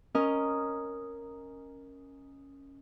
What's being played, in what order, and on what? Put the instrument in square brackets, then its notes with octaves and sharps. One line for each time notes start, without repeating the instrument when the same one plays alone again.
[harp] C#4 A#4 D#5